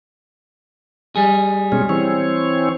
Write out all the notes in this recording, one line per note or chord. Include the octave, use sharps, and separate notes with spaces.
G3 G#4
B2 G#3 C#4
E3 C4 C#5